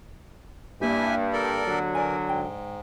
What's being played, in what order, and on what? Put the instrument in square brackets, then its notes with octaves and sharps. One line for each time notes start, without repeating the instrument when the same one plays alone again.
[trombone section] G2 [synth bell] A#3 G4 [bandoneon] E4 E5 G#5
[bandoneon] A4 A#4 D5
[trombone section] D3 F#3
[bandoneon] E3 A#4 [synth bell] D5 G#5
[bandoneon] G#2 [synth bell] G5